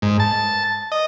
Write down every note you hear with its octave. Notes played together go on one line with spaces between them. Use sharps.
G#2
A5
D#5